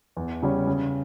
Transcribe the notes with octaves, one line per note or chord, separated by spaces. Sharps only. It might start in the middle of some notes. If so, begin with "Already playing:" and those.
E2
C#3 G3 C#4
C#3